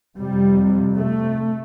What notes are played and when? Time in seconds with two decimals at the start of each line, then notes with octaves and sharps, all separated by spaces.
0.17 F2 C3 G3
0.97 A3